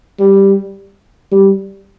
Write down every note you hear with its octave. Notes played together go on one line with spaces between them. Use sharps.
G3
G3